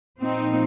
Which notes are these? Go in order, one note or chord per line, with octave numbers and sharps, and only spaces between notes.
A#2 F3 A#3 C4 D#4